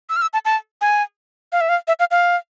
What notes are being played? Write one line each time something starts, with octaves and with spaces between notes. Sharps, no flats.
E6
F6
E6
A5
A5
G#5
F5
E5
F5
E5
F5
F5